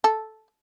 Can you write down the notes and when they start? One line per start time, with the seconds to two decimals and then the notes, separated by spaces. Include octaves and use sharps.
0.04 A4